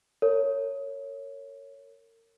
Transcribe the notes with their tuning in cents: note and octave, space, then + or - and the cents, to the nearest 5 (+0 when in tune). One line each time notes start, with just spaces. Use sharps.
A#4 -35 C#5 +0